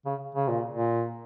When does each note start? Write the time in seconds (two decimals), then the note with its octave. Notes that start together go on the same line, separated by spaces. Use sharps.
0.06 C#3
0.35 C#3
0.48 A#2
0.74 A#2